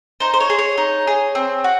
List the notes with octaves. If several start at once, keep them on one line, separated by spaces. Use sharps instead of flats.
D#4 C5
C5
C#5
G#4
C#5
D#4
G#4
C4
F#4